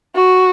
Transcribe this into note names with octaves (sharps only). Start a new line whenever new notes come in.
F#4